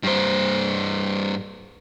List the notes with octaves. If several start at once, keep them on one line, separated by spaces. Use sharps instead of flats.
G2 C5